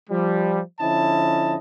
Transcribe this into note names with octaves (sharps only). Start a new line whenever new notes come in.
F3 G3
D3 F3 C#4 E4 D#5 A5